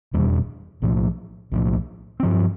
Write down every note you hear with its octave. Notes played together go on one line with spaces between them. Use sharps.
F1 E2 B2 G3
B1 A2 F3
B1 A2 F3
G2 F3 C4